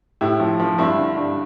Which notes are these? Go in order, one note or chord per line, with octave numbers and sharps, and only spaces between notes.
A2 E4 G4
F3
F3
G2 C4 E4
D3
G2